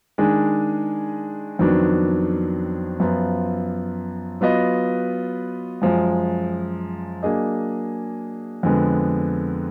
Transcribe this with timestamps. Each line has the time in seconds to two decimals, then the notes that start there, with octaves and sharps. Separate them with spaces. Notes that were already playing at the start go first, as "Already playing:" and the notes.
0.18 D#3 G#3 D4 G#4
1.59 F2 D#3 F#3 B3 D4
3.00 F#2 F3 B3 F4
4.41 F#3 B3 F4 B4 D#5
5.82 F#2 F3 G#3
7.23 F#3 A#3 D4 G#4 D#5
8.63 F2 D3 G#3 B3